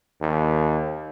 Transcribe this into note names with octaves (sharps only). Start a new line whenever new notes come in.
D#2